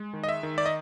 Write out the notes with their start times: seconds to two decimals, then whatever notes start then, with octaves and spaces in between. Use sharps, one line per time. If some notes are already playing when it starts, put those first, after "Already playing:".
Already playing: G#3
0.13 D#3
0.23 D#5
0.29 E5
0.43 D#3
0.58 D5
0.66 D#5